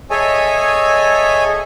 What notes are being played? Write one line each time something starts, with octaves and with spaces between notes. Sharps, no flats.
G#4 A4 C#5 D#5 E5 G#5